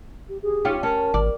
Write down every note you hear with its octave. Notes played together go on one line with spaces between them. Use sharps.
G4
G4 G#4
C#4 D#4 F4 G4
C#4 A#4 A5
G#1 D5